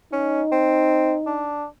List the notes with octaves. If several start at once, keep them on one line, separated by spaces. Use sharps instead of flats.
C#4 D#4
C4
D4